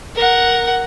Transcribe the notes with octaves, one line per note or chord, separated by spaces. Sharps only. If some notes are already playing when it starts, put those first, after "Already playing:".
A#4 F#5